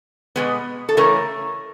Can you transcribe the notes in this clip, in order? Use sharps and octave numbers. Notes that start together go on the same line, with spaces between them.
B2 G#3 B3
A4
C#3 E3 A3 C#4 A#4